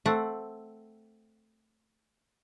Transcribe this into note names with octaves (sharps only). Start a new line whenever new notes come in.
A3 C4 F#5